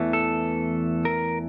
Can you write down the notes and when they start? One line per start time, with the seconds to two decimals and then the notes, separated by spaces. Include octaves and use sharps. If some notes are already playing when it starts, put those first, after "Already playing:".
Already playing: E2 E3 A3
0.13 A4
1.05 A#4